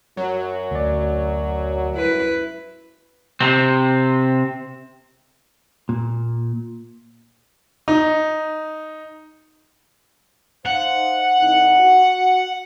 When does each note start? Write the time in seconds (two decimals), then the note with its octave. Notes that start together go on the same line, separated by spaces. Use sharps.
0.17 F#2 F#3
0.71 D2 D5
1.93 E4 B4
3.41 C3 C4
5.89 A#2
7.88 D#4
10.66 D#4 C5 F5 F#5
11.40 C2 D#4
11.80 F#4